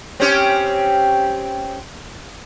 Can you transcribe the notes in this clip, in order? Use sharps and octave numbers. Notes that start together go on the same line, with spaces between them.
C4 C#4 G4